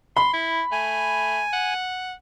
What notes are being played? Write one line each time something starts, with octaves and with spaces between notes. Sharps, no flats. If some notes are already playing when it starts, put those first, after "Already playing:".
B5 C6
E4
A3 G#5
F#5